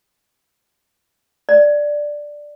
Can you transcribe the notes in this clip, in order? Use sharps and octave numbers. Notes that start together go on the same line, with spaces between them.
D5